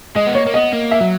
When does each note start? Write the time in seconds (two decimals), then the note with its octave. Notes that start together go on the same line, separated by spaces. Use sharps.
0.15 G#3 D#5
0.27 B3
0.35 A#3 C#5
0.46 A#3
0.54 B3 D#5
0.73 A#3
0.91 E5
1.01 F#3